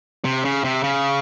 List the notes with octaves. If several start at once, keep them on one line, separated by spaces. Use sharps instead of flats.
C3
C#3
C3
C#3